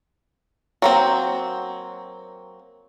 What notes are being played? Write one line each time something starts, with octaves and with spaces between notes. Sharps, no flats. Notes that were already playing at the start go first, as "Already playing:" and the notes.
F#3 A#3 C4